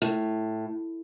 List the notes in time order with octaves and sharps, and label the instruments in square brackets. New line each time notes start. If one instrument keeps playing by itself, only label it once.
[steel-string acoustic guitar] A2